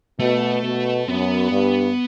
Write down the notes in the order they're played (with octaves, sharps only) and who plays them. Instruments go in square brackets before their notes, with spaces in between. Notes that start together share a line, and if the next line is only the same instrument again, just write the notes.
[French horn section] B2 [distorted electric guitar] A3
[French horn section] B2
[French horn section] F#2 [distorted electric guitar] B3
[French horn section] G2